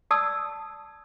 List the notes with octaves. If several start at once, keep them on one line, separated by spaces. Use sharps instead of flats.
D5 A5 D#6 E6